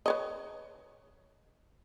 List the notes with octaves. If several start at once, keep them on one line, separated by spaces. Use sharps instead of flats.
B4 C#5 D#5